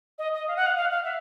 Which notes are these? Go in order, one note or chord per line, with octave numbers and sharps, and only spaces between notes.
D#5
D#5
F5
F#5
F5
F5
F5
E5